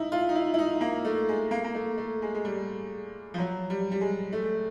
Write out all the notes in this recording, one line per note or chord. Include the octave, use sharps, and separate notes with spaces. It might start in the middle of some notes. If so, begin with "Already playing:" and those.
Already playing: D#4 E4
F4
D#4
E4
E4
D#4
A#3
A3
G#3
A#3
A#3
A3
A3
G#3
G#3
G3
F3
F#3
G3
G3
G#3
A3